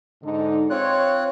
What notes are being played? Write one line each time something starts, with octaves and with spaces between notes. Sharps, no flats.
G#2 D3 D#4
C4 F4 C#5 F#6